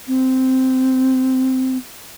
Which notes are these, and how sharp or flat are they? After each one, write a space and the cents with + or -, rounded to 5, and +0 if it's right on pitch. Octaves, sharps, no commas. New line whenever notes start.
C4 -10